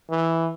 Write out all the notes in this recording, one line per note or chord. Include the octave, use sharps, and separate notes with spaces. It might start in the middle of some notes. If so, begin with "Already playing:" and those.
E3